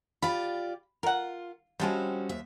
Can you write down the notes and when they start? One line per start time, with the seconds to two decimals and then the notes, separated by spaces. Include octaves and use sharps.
0.22 F4 G4 D5 B5
1.03 F4 A#4 F#5
1.80 F3 G3 G#3 C4 C#4 F#4
2.29 D#2 E5